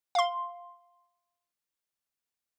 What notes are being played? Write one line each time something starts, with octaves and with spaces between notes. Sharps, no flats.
F5 C6